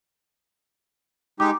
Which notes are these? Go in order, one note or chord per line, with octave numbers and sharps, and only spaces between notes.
G#3 D#4 G4 D6